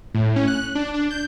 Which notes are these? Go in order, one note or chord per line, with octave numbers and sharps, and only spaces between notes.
A2
C#4
F#6
D4
D4
G6